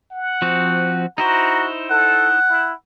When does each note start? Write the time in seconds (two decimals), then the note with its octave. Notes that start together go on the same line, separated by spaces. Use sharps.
0.12 F#5
0.42 F3 C4 F#4
1.18 D#4 E4 F#4 C5 A#5
1.91 A4 F#5
2.49 E4